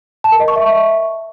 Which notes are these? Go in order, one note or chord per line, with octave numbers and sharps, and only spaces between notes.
A5
A#4
D#5
C#6
E5